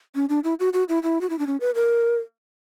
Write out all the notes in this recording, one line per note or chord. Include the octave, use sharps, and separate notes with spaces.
C#4
D4
E4
F#4
F#4
E4
E4
F#4
E4
D4
C#4
B4
A#4